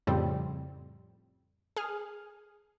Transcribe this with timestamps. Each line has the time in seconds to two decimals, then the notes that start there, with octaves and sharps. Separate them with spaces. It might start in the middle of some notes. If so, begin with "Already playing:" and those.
0.07 F2 A2 C#3 G3 C4
1.76 G#4 F6